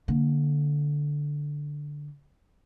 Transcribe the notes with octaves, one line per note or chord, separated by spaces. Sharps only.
D3 A#3